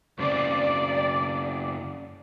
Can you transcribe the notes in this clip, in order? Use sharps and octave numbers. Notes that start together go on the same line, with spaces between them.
F#2 C#3 C4 D5